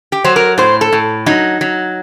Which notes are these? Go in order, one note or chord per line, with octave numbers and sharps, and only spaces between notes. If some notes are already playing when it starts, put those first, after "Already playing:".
G4
F#3 C5
A#4
A2 C5
A4
A2
F#3 D#4
F#3